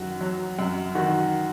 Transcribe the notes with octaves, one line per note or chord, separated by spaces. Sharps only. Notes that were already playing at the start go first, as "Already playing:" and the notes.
Already playing: F#2 D#3 F#4
F#3
F#2
D#3 F#4